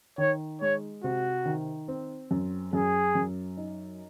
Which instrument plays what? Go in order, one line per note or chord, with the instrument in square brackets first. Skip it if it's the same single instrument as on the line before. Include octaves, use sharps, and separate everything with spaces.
[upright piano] D#3 [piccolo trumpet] C#5
[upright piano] G#3 [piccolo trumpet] C#5
[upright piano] C3 [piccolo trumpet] F#4
[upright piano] D#3
C4
F#2
[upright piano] F#2 [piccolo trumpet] G#4
[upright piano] F#2
D#4